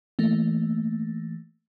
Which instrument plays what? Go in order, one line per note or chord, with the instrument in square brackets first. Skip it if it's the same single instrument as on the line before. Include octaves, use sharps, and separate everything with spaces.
[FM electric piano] E3 A3 A#3